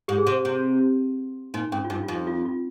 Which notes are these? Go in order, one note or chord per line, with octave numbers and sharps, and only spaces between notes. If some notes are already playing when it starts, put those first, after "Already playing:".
G#2 G4
G#4
C3
C3
A#2 D#4
G#2 C#4
F4
G2 D#4
F4
F2 D#4
F4
F4